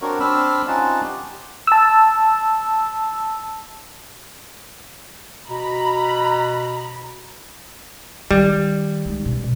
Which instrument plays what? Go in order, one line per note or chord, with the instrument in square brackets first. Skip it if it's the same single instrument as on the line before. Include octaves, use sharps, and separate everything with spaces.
[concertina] C4 D4 F#4 A#4 C#5
C4 D4 B5 E6 F6
C4 C#4 D#4 F4 F#5 A5
G4
[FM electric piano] A5 E6
[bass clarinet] B2 [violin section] A#5 B5
[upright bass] D#3 [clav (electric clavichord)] G3
[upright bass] G#3 D#4
C#2 B2